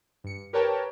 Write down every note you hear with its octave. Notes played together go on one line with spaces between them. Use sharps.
G2 C#7
G4 A#4 B4 C#5 G5 A5